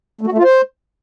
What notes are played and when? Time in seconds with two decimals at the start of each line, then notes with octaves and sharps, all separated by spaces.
0.21 A3
0.27 F#4
0.32 A3
0.38 F4
0.44 C5